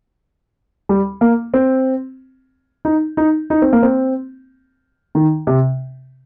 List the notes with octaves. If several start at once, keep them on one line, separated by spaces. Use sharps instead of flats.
G3
A#3
C4
D#4
D#4
D#4
C4
A#3
C4
D#3
C3